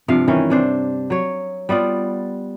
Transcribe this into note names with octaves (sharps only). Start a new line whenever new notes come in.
G2 C3 F3 F5
D#3 E3 C#4
C3 D4 C5
F#3 C#5
G3 B3 F4 D5